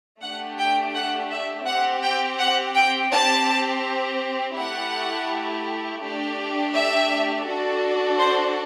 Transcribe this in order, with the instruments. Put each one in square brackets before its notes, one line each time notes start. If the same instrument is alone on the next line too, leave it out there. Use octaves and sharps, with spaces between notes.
[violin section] A3 D4 G4 F#5
G5
F#5
E5
C4 G4 F#5
G5
F#5
G5
C4 G4 A5
A3 E4 G4 F#5
A3 D4 G4
E5
D4 F#4 A4
C5